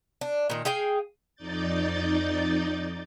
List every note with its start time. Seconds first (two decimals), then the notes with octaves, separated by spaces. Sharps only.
0.21 D4
0.50 A#2 D#3
0.65 G#4 F5 G5 G#5
1.35 F2 D#4 D5 G6 A6